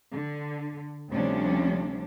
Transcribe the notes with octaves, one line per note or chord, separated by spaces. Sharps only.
D3
D2 C3 F3 G3 C#4 D4